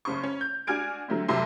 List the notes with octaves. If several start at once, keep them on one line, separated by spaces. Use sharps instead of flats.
F#1 C#3 C5 C#6
C#4
G6
D4 F#4 G#5 F6 G#6 D7
D3 F#3 A3 C4
F1 C3 F#3 C6